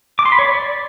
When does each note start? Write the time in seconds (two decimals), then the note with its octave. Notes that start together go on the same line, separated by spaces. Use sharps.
0.19 D6
0.25 C6
0.32 B5
0.39 C#5
0.45 D5